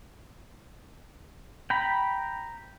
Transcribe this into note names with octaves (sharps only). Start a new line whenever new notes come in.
G5 A#5 B5